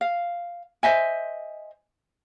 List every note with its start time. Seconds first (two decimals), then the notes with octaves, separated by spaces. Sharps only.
0.01 F5
0.83 C5 D#5 E5 G#5